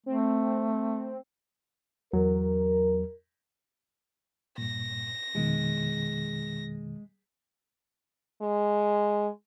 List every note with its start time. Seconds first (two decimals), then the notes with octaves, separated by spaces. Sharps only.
0.06 A3 C4
2.13 E2 F#3 A#4
4.58 G2 A#2 A#6
5.35 F2 B2 D#3 G#3
8.42 G#3